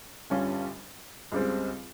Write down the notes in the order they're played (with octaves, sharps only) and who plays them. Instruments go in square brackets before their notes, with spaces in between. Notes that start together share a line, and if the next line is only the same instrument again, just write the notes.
[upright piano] G1 G2 G3 C#4 F4
C#2 C#3 G3 C4